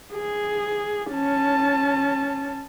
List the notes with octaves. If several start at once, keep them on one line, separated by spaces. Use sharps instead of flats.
G#4
C#4 A5